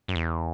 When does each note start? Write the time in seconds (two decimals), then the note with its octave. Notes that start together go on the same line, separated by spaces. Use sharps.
0.08 F#2
0.16 E2